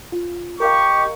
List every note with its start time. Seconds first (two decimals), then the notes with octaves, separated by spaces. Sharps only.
0.12 F4
0.60 G4 A#4 D#5 F5 C#6